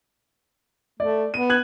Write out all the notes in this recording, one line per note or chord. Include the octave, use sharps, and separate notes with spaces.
A3 D5
B3 D#7
F#6 G#6 F#7